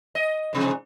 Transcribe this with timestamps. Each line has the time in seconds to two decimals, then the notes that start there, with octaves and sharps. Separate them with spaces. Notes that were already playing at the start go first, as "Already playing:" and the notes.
0.15 D#5
0.53 G#2 C3 F3